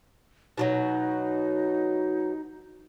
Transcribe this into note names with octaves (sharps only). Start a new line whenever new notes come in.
B2 F3 F#3 D#4